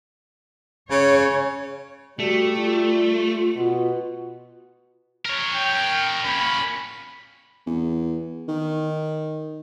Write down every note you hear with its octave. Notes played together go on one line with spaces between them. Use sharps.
C#3 C#5
G3 A3 F#4
F4
B2
A#4 C#5
G5
A#3 C#4 B5
E2
D#3